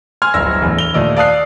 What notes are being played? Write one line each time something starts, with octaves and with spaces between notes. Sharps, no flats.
G#5 C6 F6 G#6
D1 G1 E6 A#6
E2 A2
F7 G7
D#2 A#2 A3 D5 D#5 E6
D5 F5 A5 D#6 F#6 C7